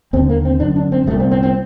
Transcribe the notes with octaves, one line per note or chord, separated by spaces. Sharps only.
D#2 D3 C4
A#3
C4
F#2 D3 D4
D4
C4
C2 A#2 A3
C4
C4
C4